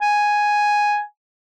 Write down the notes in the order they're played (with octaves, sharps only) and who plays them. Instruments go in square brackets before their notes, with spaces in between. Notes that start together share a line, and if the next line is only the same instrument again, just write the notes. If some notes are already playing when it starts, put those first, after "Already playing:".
[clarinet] G#5